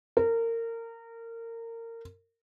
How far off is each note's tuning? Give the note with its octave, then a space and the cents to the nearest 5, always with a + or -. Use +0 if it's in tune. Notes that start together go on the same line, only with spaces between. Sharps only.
A#4 -25